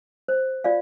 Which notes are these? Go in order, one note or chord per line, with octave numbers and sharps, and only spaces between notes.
C5
F4 D5 F5